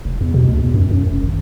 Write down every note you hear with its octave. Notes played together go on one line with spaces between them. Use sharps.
F1
E2
B2
D2
E2
F#2
F#2
F1
G#1